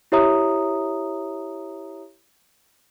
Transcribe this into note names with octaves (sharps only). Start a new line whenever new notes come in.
E4 G4 C#5 E5 A#5 D#6